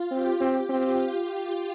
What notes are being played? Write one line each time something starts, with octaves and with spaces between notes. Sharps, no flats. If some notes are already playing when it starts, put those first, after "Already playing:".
Already playing: F4
C4 G4
C4
C4 F4